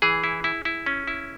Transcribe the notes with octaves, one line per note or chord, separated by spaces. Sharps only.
E3 G#4
E4
E4
E4
C#4
E4